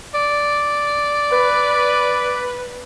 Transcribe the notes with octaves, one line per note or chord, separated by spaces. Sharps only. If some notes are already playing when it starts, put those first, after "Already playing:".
D5
B4